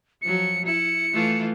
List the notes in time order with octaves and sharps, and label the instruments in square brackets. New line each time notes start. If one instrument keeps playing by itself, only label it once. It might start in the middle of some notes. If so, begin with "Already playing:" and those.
[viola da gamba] F3 F#3 [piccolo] C#7
[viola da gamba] E4 [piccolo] C#7
[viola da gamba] E3 A3 F4